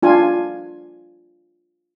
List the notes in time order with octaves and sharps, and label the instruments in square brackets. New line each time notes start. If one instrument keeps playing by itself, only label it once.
[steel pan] D4 F4 G#5